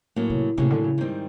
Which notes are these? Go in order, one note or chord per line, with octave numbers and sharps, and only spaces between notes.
A2 F#3 A#3 C#4
C3
A2 C3 F#3 A#3 C#4
D3
C#3
G#2 D#3 G3 C4 D#4